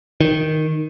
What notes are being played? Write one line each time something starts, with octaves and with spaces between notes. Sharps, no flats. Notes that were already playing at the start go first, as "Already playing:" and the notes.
D#3